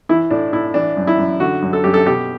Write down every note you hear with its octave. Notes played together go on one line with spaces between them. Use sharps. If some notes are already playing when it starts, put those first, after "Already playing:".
E3 E4
A2 D4
A2 E4
E3 D4
F#2
E4
F#2
D3 F#4
F#2
A4
F#2 G4
A4
B2 G4